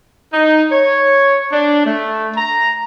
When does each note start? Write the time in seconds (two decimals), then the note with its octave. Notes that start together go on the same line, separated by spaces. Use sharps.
0.33 D#4
0.72 C#5
1.52 D4
1.85 A3
2.36 A#5